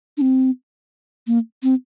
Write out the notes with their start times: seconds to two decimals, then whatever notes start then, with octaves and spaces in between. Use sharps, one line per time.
0.17 D4
0.21 C4
1.27 A#3
1.63 C4